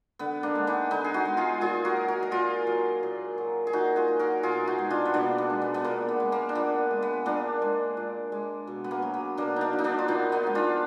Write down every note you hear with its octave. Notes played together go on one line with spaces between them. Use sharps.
D3 B3
A#3 D4
G#3
B3 D#4
D3 B3 D#4
G#4
D#4 F#4
G#3
F4 G#4
A#2 F4 G#4
F#4 A#4
F#3
F#4 A#4
A#4
A#2 F4 G#4
F#3
A#2
F#3
G#4
A#2 D#4 F#4
F4 G#4
F#3
F#4 A#4
B2 F4 G#4
D#4 F#4
G#3
D4 F4
B3
B2 A#3 D4
B3
G#3
B3
B3
A#2 A#3
B3
G#3
A#3
D4
A#2 B3
G#3
B3
A#2 A#3 D4
G#3
A#2
G#3
B2
B3
A#3
F#3
B3
B2 A#3 D4
A#3 D4 D#4
F#3
D#4
A#3 D4
F4
A#2 B3 D#4
B3 D#4
F3 G#3
D4 F4